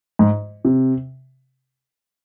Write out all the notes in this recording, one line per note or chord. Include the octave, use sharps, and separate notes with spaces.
G#2
C3